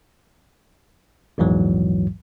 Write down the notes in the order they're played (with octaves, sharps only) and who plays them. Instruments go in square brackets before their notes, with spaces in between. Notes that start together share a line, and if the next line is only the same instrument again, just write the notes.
[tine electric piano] A#1 E2 G#2 E3 F#3